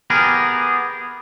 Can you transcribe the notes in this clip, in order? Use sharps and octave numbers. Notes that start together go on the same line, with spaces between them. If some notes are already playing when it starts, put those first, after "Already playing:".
B3 G4 G#4 A#4